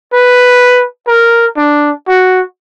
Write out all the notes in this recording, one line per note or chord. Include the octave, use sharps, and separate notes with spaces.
B4
A#4
D4
F#4